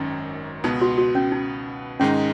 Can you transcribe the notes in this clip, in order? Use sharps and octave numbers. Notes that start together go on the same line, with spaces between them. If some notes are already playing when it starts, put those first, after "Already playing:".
Already playing: G#1 F#2 D#3 C#4
C#2 B2 B3 D#4
F#4
F#4
C#4
D#4
G#2 D#3 G#3 C#4 D#4